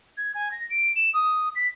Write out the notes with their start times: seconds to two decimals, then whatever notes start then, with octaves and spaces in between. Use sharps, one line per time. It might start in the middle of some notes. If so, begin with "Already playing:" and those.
0.17 G#6
0.35 G#5
0.52 A#6
0.70 D7
0.96 E7
1.14 D#6
1.55 B6